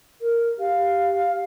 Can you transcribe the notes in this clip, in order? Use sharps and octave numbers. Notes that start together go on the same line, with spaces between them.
A#4
G4 F5